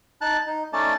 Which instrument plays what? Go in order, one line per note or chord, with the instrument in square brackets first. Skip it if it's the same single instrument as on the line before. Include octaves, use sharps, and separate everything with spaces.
[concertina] D#4 A5 F#6
D#4
A3 C#4 D#4 D5 A5